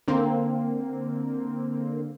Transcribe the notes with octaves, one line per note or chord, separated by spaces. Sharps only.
D3 A#3 C4